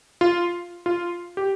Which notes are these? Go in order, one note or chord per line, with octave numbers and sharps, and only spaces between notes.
F4
F4
G4